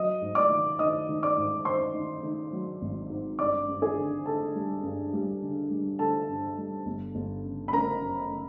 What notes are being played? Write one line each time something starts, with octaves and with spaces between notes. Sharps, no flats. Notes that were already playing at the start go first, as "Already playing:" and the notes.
Already playing: F#3 D#5 D#6
G#2
D5 D6
D#3
D#3 D#5 D#6
D#3
D5 D6
G#2
D#3 C5 C6
D#3
D#3
F#3
G#1
G#2
G2 D5 D6
G2
G#4 G#5
D3
D3 A4 A5
G3
G2
G3
D3
G3
D3 A4 A5
G2
G3
G1
G1
C#3
B5
C#3 A#4 A#5
F#2
C#3